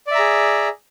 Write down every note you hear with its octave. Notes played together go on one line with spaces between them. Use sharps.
G#4 D5 E5 A#5